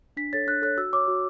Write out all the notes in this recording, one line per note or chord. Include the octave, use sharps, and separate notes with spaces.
D4 B6
A4 C#5 A6
D4 F#6
A4 C#5 F#6
F#4 E6
C#5 D6
F#4